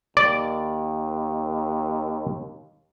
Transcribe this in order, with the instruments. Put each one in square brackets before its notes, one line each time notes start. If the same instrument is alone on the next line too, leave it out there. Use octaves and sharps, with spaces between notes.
[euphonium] D#2 [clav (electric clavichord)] D5